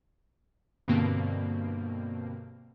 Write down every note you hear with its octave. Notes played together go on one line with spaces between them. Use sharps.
G2 B2 D3 A#3 C4